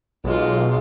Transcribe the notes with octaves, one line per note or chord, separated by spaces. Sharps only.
B1 G#3 F4